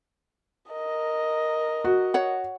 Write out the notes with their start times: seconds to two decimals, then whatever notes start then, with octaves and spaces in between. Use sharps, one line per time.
0.71 A#4 D#5
1.85 F#4
2.14 C#5 F#5